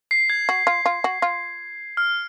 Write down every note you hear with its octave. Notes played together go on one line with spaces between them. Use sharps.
C7
G#6
F#4
F4
F4
F#4
F4
F6